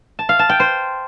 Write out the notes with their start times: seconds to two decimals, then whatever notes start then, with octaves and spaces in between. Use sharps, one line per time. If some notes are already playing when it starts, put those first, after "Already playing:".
0.19 A5
0.29 F5
0.39 A5
0.49 G5
0.60 C5